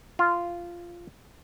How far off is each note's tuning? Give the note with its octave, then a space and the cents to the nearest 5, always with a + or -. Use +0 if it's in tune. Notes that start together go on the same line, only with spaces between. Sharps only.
F4 -10